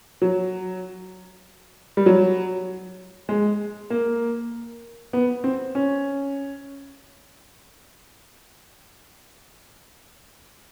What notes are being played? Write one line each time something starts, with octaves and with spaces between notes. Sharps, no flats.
F#3
G3
F#3
G#3
A#3
B3
C4
C#4